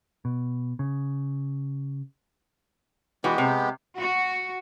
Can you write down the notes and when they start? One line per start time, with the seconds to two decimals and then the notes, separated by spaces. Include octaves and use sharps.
0.25 B2
0.79 C#3
3.24 E3 G#3 B3 F#4 G4
3.38 C3
3.96 F#4